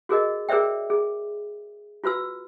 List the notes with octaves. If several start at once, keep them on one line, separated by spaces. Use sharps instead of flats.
F#4 G#4 A#4 D#5
G#4 A#4 C5 D5 E5 G5
G#4
F4 F#4 B4 E6